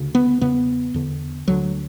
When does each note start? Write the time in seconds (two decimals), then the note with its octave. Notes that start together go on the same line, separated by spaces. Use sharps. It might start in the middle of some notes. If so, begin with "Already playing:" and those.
Already playing: D2 C#3
0.15 B3
0.41 E2 C#3 B3
0.94 E2 D3
1.47 D2 D3 F#3